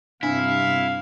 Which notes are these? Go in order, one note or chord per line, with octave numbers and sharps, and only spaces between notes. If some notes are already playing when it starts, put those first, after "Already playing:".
G2 C3 D4 E4 F5